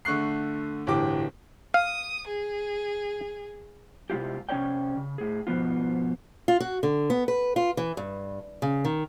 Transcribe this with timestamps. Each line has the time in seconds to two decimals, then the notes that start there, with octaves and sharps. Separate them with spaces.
0.05 D3 A3 C#6 F#6 C7
0.87 D1 G1 E3 G4 D6
1.74 F5 D#6
2.27 G#4
4.10 C3 G#3 E4 F4 G4
4.49 C3 C#4 G4 C#5 D5 G5
4.97 C#3
5.18 A2 G#4
5.47 G#2 B2 F3 B3 F4
6.48 F4
6.60 F#4
6.83 D3
7.10 B3
7.28 B4
7.56 F4
7.77 E3
7.97 G2
8.62 C#3
8.85 D#3